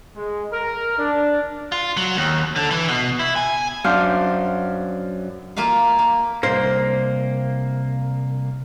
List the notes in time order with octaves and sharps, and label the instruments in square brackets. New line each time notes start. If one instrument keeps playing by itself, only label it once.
[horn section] G#3
A#4
D4
[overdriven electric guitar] F4
F#3
D#2
D3
E3
B2
E4
G#5
[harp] F#2 D4 C5 F5 F6 G6
[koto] A#3 F4 E5 F5
A#3
[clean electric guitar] C2 A#3 [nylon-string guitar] C5